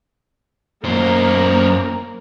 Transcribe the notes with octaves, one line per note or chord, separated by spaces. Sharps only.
F#2 A#3 A#4 C5